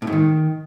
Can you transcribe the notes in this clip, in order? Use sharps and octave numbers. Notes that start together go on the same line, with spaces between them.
A2
G#2
D#3